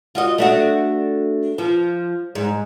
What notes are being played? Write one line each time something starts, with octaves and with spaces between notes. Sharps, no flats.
F4 F#4 D#5
A3 D4 F#4
F3
G#2